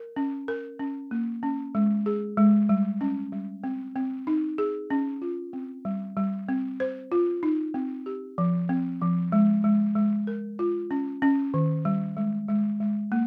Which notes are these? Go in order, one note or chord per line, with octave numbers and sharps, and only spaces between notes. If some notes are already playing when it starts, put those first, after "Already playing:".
Already playing: A#4
C#4
A#4
C#4
A#3
C#4
G#3
G#4
G#3
G3
C#4
G3
C4
C4
D#4
G#4
C#4
F4
C4
G3
G3
C4
C5
F4
D#4
C4
G4
F3
C4
F3
G#3
G#3
G#3
A#4
F4
C#4
C#4
D#3
G3
G#3
G#3
G#3
A#3